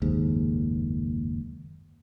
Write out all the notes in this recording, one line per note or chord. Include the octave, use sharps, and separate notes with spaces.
F#1 D#2 G#2